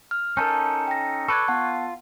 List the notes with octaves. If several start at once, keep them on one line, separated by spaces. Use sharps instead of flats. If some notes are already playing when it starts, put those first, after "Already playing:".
F6
C#4 D#4 A4 A#4 A5 G6
G5 A#6
A4 B4 D5 C#6 F#6 G#6
B3 F4 F#5 A5